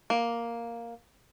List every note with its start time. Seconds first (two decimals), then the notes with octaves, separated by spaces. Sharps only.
0.10 A#3